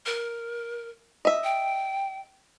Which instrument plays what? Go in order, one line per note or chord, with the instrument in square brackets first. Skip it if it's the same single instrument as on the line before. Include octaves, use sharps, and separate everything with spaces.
[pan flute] A#4
[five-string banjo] D#5 E5
[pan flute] G5